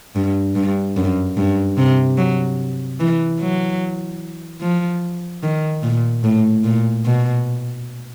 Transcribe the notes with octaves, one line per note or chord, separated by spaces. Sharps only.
G2
G2
F#2
G2
C3
F#3
E3
F#3
F3
D#3
A#2
A2
A#2
B2